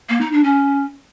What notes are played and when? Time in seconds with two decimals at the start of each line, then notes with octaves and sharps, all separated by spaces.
0.09 A#3
0.21 D#4
0.32 D4
0.44 C#4